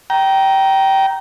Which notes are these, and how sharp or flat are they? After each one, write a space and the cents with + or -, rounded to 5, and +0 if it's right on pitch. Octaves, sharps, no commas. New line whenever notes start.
G5 -15 A#5 +10